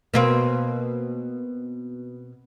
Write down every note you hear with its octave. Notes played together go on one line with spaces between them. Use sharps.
B2 A#3 C4